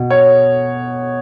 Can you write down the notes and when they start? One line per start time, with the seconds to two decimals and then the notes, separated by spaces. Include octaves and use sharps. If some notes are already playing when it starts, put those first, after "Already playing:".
Already playing: B2
0.10 C#5